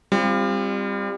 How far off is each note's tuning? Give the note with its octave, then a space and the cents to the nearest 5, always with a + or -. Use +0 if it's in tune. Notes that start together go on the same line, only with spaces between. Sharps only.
G3 +25 C4 +10 F4 -10